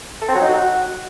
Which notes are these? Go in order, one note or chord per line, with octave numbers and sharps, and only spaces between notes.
A4
C4
F#3
D#4
F#4